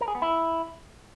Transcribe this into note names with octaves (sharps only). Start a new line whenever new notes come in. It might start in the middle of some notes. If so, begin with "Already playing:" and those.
A#4
G#4
B3
E4